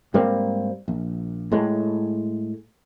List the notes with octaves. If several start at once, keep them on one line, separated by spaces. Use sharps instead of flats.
G#2 G3 A#3 C4
A#1
A2 G#3